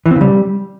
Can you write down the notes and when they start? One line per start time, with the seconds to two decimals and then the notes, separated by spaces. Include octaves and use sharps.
0.06 E3
0.11 C4
0.16 C#3
0.21 G3